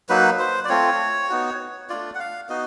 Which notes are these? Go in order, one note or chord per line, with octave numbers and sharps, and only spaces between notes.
F#3 A#3 D#4 F#4 B4
C5
D5
A3 C4 F4 C#5
B3 D#4 F#4
A3 D4 F4 D5
F#5
F5
B3 D#4 F#4 D#5